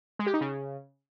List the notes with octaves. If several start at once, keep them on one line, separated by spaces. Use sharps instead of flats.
G#3
G4
D#4
C#3